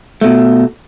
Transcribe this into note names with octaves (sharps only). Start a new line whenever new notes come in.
B2 A3